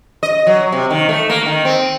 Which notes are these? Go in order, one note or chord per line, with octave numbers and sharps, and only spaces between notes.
D#5
F#3
C3
D#3
A3
A#3
D#3
C4